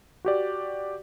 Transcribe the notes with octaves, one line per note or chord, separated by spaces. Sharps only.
F#4 G4 D5